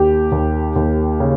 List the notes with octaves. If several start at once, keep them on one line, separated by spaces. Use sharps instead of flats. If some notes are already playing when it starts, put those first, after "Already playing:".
Already playing: D#2 G4
D#2
D#2
C#3